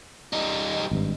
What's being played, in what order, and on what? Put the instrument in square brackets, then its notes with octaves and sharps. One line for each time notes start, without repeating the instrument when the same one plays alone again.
[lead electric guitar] G3 D#4
[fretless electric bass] G#1 G2